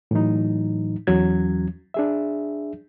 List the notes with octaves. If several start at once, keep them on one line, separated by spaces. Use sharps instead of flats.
A2 E3 F#3 D#4
E2 E3 F#3 C#4 G#6
D4 G#4 E5